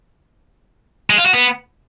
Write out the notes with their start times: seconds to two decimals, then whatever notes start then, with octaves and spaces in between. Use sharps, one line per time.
1.10 G#3
1.18 F4
1.26 F#4
1.34 B3